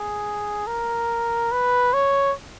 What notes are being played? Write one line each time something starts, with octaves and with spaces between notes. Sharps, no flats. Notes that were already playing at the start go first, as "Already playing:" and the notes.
Already playing: G#4
A#4
B4
C#5